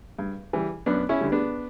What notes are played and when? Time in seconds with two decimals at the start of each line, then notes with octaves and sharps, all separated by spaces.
0.19 G2
0.53 E3 G3
0.86 F#2 B3 D4
1.09 C#4 E4
1.21 D3 G3
1.32 B3 D4